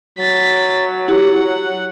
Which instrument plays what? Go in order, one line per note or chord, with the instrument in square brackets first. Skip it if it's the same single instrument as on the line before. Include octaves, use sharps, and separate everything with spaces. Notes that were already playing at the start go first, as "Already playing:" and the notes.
[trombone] F#3 [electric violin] A6 B6
[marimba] E4 G4 [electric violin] F#5